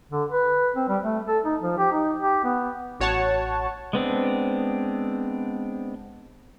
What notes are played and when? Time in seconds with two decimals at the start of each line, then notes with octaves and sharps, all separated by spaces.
0.12 D3
0.31 B4
0.76 C4
0.89 G3
1.03 A3
1.28 A4
1.45 D#4
1.61 F3
1.78 G4
1.92 D#4
2.20 G4
2.44 B3
3.00 A1 F#4 C#5 F#5 A5 C#6
3.93 G#3 B3 C4 D4